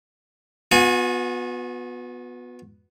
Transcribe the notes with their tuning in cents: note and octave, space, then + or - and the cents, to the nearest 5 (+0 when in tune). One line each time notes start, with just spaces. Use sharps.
B3 +0 F#4 -40 G#5 +0